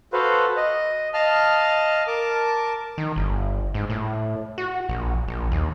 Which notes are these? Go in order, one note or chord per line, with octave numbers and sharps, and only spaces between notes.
F#4 A4 B4 C5 F5
D#5
D#5 F5 A5 F6
A#4 A5 D6
D#3
G1
G#2
A2
F#4
A#1
A#1
D#2